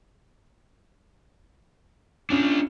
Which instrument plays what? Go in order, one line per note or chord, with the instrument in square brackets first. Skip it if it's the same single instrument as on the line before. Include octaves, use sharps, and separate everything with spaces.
[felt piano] C#4 [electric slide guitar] D4 F4